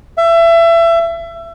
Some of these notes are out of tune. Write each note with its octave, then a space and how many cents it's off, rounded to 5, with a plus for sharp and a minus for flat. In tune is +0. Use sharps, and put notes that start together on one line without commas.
E5 +25